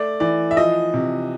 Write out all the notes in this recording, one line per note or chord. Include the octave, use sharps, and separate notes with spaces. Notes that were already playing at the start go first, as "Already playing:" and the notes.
Already playing: A3 D5
E3 D5
E5
F3 D#5
C3